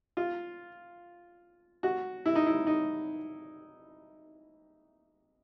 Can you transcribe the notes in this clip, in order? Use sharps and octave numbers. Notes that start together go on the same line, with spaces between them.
F4
F#4
E4
D#4
E4
D#4